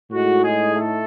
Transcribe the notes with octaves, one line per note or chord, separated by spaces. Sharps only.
A2 G#3 D#4 F#4
G#3 G#4
A3 A4